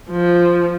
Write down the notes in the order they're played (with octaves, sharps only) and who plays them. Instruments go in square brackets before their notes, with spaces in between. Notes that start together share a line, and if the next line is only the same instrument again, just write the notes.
[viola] F3